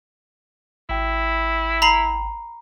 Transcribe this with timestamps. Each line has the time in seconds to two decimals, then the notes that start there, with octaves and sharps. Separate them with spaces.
0.89 G#1 E4 G5
1.82 A#5 B5 C7